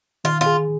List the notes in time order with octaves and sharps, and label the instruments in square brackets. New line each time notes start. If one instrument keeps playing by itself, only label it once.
[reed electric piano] D#3 [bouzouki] F4
[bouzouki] F4
[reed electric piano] G#4